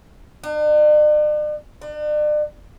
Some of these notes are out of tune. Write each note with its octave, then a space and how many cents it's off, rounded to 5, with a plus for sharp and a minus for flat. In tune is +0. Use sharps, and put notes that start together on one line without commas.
D4 +45
D4 +40